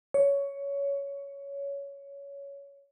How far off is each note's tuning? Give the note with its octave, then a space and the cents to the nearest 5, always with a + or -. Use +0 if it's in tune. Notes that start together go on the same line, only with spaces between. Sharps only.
C#5 +15